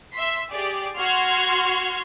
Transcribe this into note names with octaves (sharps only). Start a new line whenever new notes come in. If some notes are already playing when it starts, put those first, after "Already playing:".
E5 C6 B6
G4 G#4 D5
F#4 C6 F6 G#6